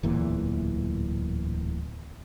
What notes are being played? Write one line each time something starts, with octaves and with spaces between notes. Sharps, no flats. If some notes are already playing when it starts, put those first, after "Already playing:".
D1 E2 A#2 E3